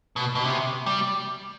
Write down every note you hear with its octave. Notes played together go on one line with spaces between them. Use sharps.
B2
B2
C3
G3